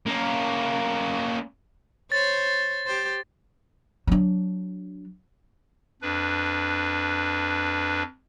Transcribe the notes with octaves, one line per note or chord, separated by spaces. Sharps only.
A#3 C#4
C5 C#5 A6
G4 C5
F#3 D4
F2 D4 B4